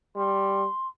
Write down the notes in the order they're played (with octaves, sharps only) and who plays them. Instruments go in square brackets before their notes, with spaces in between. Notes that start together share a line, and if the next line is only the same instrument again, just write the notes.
[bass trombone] G3 [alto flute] C6